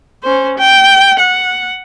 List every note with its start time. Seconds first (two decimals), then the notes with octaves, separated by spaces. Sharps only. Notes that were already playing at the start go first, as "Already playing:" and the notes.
0.23 C#4 C5
0.59 G5
1.19 F#5